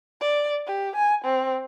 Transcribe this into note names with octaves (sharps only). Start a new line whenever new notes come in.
D5
G4
G#5
C4